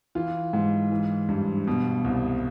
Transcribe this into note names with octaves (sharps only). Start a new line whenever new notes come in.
E3 F4
G#2
E3
G2
B2
C2